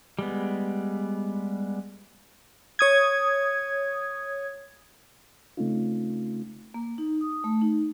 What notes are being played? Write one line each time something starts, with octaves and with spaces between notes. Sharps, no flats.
G3 G#3 B3
C#5 D#6 G#6
C#3 A3 C4 C#4 D#4 F4
A#3
D#4
D#6
A3
D#4